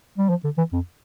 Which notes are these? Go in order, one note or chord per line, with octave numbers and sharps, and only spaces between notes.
G3
F3
D3
E3
F2